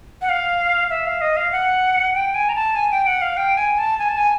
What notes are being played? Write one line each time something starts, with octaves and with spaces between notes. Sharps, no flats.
F#5
F5
E5
F5
D#5
F5
F#5
G5
G#5
A#5
A5
G#5
G5
F#5
F5
G5
G#5
A5
G#5
A5
G#5